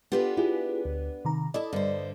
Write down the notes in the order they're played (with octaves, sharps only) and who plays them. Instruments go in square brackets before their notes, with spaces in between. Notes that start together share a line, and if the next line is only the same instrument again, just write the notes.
[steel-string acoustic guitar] B3 D4 B4 [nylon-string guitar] F4 G4 A4
[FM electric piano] E4 F4 G#4 [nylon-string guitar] G4
[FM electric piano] D2
C3 D#3 A#5
[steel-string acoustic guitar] E4 A4 A5 [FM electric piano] D5 D#5
[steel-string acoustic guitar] G2 C5 [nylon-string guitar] D3